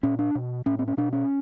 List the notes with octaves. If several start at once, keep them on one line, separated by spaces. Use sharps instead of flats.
A#2 C#4
D4
B2
A2 C#4
C4
C#4
B2 D4
C#4